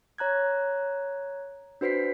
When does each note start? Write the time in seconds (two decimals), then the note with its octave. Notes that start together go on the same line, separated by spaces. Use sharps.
0.18 C#5 A#5 F#6 G#6
1.81 D4 F#4 B4 C5 B6 C7